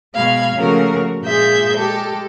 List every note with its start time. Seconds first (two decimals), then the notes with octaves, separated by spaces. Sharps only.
0.16 B2 G#3 F5 B5 G#6
0.55 C#3 F3 A3 A#3 F#4 A#4
1.23 A#2 G#3 A#3 G#4 E5 G6
1.77 G#3 G4 A4